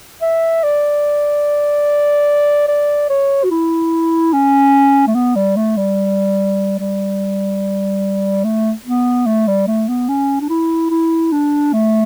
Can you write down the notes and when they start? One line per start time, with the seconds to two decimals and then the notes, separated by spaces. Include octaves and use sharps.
0.22 E5
0.63 D5
2.68 D5
3.10 C#5
3.44 F#4
3.51 E4
4.33 C#4
5.07 A3
5.15 B3
5.36 G3
5.56 A3
5.77 G3
6.80 G3
8.44 A3
8.85 B3
9.26 A3
9.48 G3
9.67 A3
9.88 B3
10.09 C#4
10.41 D4
10.50 E4
10.91 E4
11.32 D4
11.73 A3